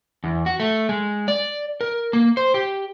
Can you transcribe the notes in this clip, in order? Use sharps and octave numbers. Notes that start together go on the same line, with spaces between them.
E2
F#4
A3
G#3
D5
A#4
A#3
C5
G4